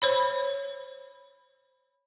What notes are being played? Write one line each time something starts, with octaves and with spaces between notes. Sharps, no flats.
C5 C#5 B5